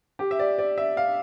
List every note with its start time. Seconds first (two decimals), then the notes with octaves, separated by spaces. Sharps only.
0.19 G4
0.31 E5
0.39 D5
0.58 D5
0.78 E5
0.97 F5